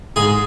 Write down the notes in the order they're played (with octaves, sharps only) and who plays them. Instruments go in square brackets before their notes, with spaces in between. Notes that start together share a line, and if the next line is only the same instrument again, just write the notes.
[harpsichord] G#2 G#4